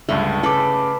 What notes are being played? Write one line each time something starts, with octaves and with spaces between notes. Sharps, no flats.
C#2 G2 D3 A3
C#3 A4 B4 D6